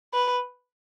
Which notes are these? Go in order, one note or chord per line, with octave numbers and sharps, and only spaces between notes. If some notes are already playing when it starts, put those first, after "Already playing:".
B4